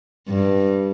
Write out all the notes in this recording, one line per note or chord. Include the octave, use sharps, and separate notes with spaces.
G2